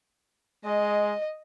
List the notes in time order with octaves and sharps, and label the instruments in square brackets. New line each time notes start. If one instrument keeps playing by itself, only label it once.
[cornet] G#3 [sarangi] D#5